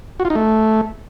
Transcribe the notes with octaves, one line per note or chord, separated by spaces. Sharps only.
F#4
F4
D#4
A3